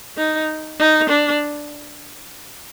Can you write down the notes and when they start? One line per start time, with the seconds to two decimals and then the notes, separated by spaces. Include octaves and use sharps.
0.18 D#4
0.80 D#4
1.10 D4